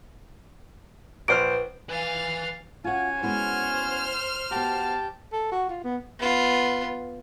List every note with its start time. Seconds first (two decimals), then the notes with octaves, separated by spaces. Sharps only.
1.28 A#1 B4 C5 F6 D7
1.89 E3 B4 F5 G#5 A6
2.84 C#4 F4 F#4 F#5 G#5
3.22 G#3 B3 E4 C5 F6
4.51 B3 F#4 G4 A5
5.32 A4
5.51 F#4
5.69 F4
5.84 B3
6.20 B3 F4